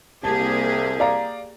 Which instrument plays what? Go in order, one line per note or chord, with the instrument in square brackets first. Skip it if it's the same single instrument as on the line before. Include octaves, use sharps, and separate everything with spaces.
[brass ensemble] C2 [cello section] A#3 G4 G#4 [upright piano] A5
[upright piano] D5 F5 A#5